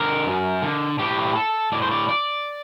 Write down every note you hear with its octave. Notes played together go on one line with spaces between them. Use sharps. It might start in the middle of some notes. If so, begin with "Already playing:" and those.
Already playing: D3 A#4
F#2
D3
A2 G4
A4
A2 D5
C5
D5
D5